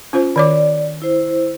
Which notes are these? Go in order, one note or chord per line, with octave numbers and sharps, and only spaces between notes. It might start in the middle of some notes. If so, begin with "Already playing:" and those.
C#4 F4 C5
D#3 C#5 D5 D6
E4 C5